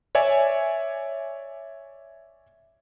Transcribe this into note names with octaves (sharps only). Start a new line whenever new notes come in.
C#5 D5 E5 G#5